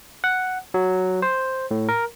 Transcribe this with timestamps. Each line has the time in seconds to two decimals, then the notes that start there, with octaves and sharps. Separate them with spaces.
0.24 F#5
0.74 F#3
1.22 C5
1.71 A2
1.89 A#4